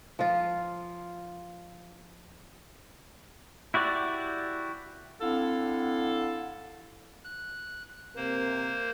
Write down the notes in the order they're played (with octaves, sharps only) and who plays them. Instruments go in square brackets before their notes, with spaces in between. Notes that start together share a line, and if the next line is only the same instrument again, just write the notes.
[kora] F3 F4
[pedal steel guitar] E4 F#4 G4 D5
[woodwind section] C4 D4 E4 A4 F5 F#5
[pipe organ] F#6
[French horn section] C3 A#4 [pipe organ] A#3 C5